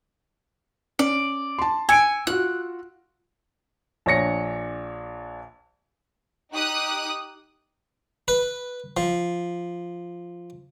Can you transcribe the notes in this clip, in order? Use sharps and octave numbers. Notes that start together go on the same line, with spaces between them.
C#4 D5
A5 C6
G#5 E6 C#7 D7
F4 F#4 F#6
A#1 D4 C#5 A#6 C#7
D#4 G4 D#6 F#6
B4
F3